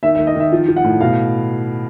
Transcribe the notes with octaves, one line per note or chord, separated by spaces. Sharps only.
D#3 E5
E5
D#3
D#5
D#3 E5
F3
F3
F#5
A2
B2 F5